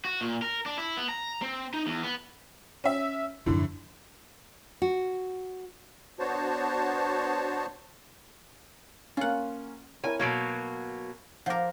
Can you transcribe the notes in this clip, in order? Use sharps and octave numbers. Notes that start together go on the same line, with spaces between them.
F#4
A#2
A#4
D4
E4
B3
A#5
C4
D#4
E2
B3
C#4 E5
F#2 A2 D3 F3
F#4
B3 D4 F#4 C5 C#5 A5
A#3 C#4 F4 F#5
E4 A#4 C#5 G#5
B2 F#3 A#3 G#6 D7
F3 A#4 F#5 D6